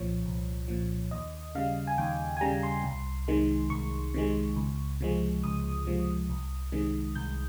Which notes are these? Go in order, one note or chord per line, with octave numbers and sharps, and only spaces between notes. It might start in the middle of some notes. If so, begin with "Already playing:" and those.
Already playing: C2 A#2 F3 C#5
C2
A#2 F3
D#2 D#5
C#3 G3 F5
G#5
D#2 G5
G#5
C#3 G3 A#5
C6
C2
C3 D#3 G#3
C2 C#6
C3 D#3 G#3
C#2
C3 F3 G#3
C#2 D#6
C3 F3 G#3
C2
C3 D#3 G#3
C2 G6